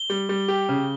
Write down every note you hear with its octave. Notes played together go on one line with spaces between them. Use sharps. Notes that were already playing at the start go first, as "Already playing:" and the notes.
Already playing: G7
G3
G3
G4
C#3